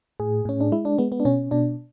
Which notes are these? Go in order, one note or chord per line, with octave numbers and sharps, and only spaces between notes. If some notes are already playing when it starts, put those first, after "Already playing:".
A2 G#4
A2 C#4
D4
G#3 E4
D4
G#3 B3
B3
D4
B2 C#4
B2 D4